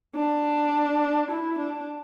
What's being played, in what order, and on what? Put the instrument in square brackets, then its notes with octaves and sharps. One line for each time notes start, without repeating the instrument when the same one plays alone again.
[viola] D4
E4
D4